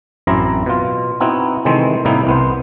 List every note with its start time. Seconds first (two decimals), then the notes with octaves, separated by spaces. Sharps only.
0.27 A1 F#2 C4 E4 A#5
0.66 B2 F4
1.20 B3 C4 D#4 E4 F#4
1.65 C3 D#3 E3 G#3 A3 C4
2.05 A2 C3 G3 A#3 D#4 E4
2.27 C2 B3 C5